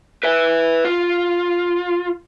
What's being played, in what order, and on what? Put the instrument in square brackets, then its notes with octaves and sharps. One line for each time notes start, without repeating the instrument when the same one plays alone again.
[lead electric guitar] B4 E5
F4